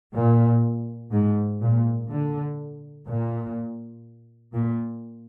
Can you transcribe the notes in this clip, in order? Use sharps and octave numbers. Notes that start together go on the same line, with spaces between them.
A#2
G#2
A#2
D3
A#2
A#2